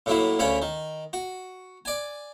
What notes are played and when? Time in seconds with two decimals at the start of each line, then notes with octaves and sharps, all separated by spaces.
0.06 A2 F#3 A#3 E4
0.39 D2 C#3 C#4 C#5 B5
0.62 D#3
1.13 F#4
1.85 D5 G#5